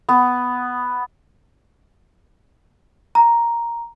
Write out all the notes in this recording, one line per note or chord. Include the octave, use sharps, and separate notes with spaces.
B3
A#5